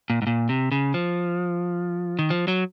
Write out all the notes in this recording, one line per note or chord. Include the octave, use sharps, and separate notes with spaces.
A#2
G#2
A#2
C3
C#3
F3
D#3
F3
F#3